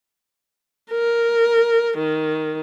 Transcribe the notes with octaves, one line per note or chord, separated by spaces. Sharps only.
A#4
D#3